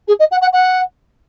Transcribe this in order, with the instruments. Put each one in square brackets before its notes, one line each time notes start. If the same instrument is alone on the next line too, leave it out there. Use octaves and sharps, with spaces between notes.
[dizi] G#4
D#5
F#5
F#5
F#5